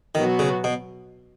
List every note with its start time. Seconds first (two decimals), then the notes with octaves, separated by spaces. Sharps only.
0.15 B2 D#3 F#3 B3 F#4
0.39 C#3
0.64 B2